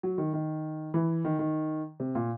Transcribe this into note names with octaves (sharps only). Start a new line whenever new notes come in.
F#3
D#3
D#3
E3
D#3
D#3
C3
A#2